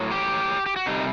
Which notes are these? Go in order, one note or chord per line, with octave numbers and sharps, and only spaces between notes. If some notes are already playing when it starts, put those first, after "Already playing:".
Already playing: A2 F#3
G4
G4
F#4
C3 G3 D#4